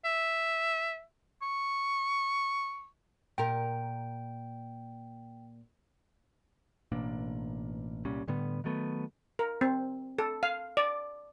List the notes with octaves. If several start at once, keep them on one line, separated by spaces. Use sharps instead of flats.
E5
C#6
A#2 A#4 G5
A1 B2 A#3 D4
C2 A#2 G3 C#4
A2 D3 G3 B3
D#3 F#3 A3 B3
A#4
C4
A4
F5
D5